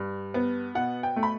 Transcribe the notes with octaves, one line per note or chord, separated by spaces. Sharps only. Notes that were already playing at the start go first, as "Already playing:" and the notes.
Already playing: G2
B3
B2 F#5
G5
A3
B5